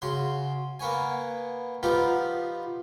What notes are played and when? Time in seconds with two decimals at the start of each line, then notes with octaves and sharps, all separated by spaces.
0.02 C#3 F#4 C6
0.80 A#3 B3 C#5 G#5
1.83 F3 B3 D#4 F4 G4